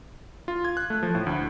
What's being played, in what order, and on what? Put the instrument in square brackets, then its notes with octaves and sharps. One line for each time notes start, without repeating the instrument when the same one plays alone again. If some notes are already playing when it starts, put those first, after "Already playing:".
[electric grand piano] F4
G#6
F#6
A3
F3
A2
D2